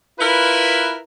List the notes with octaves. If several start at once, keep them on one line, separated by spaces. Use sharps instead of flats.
E4 F4 A#4 B4